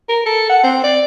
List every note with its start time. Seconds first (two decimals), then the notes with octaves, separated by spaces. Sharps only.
0.09 A#4
0.26 A4
0.50 F#5
0.64 C4
0.84 D5